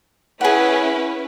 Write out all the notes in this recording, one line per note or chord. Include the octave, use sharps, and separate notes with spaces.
C#4 E4 G#4 B4 F#5